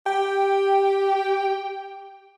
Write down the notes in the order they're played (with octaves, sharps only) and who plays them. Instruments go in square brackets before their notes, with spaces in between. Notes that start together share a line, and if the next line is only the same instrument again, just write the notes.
[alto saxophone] G4 [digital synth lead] G5